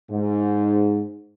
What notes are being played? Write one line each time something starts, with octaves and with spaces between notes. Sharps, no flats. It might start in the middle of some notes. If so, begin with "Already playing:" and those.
G#2